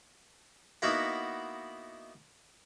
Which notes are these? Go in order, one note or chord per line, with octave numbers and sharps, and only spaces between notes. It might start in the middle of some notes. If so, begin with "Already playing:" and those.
A#3 B3 D#4 E4 F#4 B4